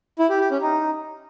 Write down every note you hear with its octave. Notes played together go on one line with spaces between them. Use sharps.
E4
G4
G4
C#4
D#4